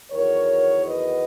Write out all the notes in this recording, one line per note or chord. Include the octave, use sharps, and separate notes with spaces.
E2 D#3 F#3 A#4 C#5
B4 D#5